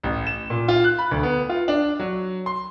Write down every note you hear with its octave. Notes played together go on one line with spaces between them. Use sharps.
A1
E7
A#2
F4
F#6
B5
D2
B3
F4
D4
F#3
C6